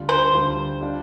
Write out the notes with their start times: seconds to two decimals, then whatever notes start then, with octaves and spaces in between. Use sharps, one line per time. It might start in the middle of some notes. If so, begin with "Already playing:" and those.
Already playing: D2 D3 G3 F4
0.09 C5
0.33 D2 D3 G3 F4
0.81 G3 D4 F4